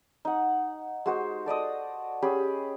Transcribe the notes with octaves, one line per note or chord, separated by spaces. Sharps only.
D#4 F#5
G#3 F#4 C5
A4 D5 D#5 D#6
C#4 G4 G#4 B5